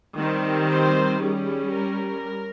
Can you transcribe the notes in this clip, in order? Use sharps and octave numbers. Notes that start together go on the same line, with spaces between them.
D#3 G3 C4
C5
G3 C#4 G#4
A#4